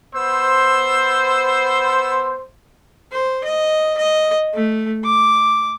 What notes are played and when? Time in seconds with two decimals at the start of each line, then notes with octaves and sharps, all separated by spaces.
0.15 B3 C5 E6
3.12 C5
3.45 D#5
3.98 D#5
4.54 A3
5.04 D6